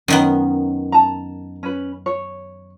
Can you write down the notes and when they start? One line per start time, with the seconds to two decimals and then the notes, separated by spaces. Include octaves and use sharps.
0.08 F#2 D#3 B3 C#4
0.92 A5 A#5
1.63 C#4 B4
2.06 C#5